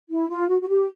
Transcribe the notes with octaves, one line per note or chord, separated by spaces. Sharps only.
E4
F4
F#4
F#4
G4